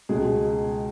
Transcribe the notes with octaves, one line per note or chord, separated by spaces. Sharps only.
C#2 B2 G#3 G#4